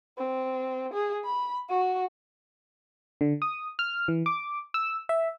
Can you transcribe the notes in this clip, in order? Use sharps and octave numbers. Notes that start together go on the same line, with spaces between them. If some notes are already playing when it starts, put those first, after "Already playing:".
C4
G#4
B5
F#4
D3
D#6
F6
E3
D6
E6
E5